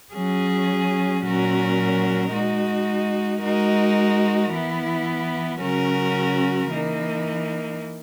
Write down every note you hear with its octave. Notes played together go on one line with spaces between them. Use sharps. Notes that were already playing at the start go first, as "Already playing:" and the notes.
F#3 C#4 G#4
A#2 F#3 C#4 F#4 A#4
G#3 D#4 F#4
G#3 D#4 F#4 A#4
E3 B3 E4
C#3 F#3 C#4 F#4 A#4
E3 A#3 D#4